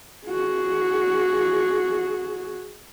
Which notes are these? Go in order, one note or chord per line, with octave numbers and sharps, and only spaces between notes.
F#4 G#4